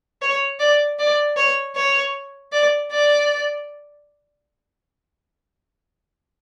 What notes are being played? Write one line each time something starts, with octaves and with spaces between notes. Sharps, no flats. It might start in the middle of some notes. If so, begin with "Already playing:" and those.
C#5
D5
D5
C#5
C#5
D5
D5